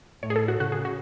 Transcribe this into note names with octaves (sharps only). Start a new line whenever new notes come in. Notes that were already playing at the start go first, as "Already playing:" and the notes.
A2 C#5
G#4
A4
F#4
C#3 F#4
G#4
F#4